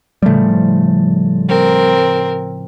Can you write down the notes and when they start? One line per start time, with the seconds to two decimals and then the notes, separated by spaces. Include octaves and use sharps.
0.22 A2 C#3 F3 G3 A3
1.49 C4 A#4